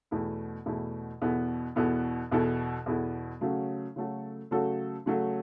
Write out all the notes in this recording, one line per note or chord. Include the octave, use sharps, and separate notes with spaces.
E2 B2 A3 E4
E2 B2 A3 E4
E2 B2 B3 E4 A4
E2 B2 B3 E4 A4
E2 B2 B3 E4 A4
E2 B2 B3 E4 A4
C#3 F#3 A3 F#4 A4
C#3 F#3 A3 F#4 A4
C#3 F#3 A3 F#4 A4
C#3 F#3 A3 F#4 A4